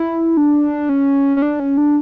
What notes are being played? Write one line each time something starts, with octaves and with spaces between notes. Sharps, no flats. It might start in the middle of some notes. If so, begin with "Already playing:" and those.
Already playing: E4
D4
C#4
C#4
D4
C#4
D4